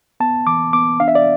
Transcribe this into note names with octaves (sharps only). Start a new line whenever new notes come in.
B3 A5
E3 D6
B3 D6
D4 F5
E5
D5